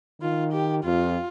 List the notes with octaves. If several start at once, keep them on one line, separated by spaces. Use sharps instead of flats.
D#3 F4
G4
F2 F4